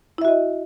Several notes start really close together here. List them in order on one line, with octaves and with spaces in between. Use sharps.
E4 E5 F#4 D#5